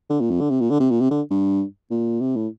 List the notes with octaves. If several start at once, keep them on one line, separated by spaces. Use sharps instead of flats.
D3
A#2
F2
D3
C3
A#2
D3
C3
A#2
C3
D3
G2
A#2
C3
A2